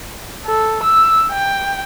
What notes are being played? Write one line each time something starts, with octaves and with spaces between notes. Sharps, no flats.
A4
E6
G5